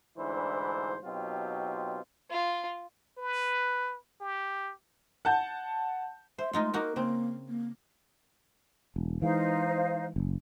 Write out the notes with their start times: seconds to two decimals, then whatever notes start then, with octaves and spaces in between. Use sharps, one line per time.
0.18 D2 G#2 E3 D4 E4 C5
1.04 B2 F#3 C4 D#4 F4 G4
2.30 F4
3.18 B4
4.21 G4
5.25 F#5 A5 G6
6.38 C5 E5
6.53 G#3 A3 D#4 F4
6.74 A#3 D#4 F#4 A#4
6.96 C#3 A#3 C4
7.49 A#3
8.96 E1
9.22 E3 G#3 D#4 C5 F5
10.16 F#1